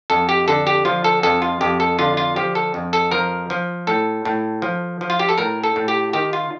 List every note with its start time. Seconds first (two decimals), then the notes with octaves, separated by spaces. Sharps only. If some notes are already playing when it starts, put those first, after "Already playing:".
0.10 F2 A4
0.29 G4
0.48 D3 A4
0.67 G4
0.85 F3 F4
1.04 A4
1.23 F2 A4
1.42 F4
1.61 F2 G4
1.80 A4
1.99 D3 F4
2.17 F4
2.36 F3 G4
2.55 A4
2.74 F2
2.93 A4
3.11 F3 A#4
3.50 F3
3.87 A2 A4
4.25 A2
4.62 F3
5.01 F3
5.10 F4
5.19 G4
5.29 A4
5.38 A2 A#4
5.64 A4
5.76 A2
5.88 G4
6.13 D#3 G4
6.33 F4